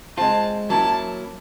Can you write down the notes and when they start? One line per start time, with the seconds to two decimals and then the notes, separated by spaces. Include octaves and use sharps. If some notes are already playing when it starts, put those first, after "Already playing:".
0.17 G#3 C4 F4 A5
0.70 F#3 A#3 C#4 E4 A5